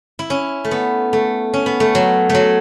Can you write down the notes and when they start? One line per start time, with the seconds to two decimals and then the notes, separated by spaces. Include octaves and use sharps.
0.19 E4
0.30 C#4
0.64 A3
0.71 B3
1.13 A3
1.53 C#4
1.66 B3
1.80 A3
1.95 F#3
2.29 A3
2.34 F#3